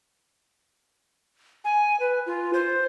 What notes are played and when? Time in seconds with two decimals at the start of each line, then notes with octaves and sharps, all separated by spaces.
1.65 G#5
2.00 B4
2.26 F4
2.54 C5